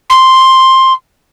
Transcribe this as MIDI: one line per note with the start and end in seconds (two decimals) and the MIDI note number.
0.10 0.93 84